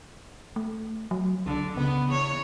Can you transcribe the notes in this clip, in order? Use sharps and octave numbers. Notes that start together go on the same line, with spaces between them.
A3
F#3
C#2 D3
C#3 B3
E2 C#5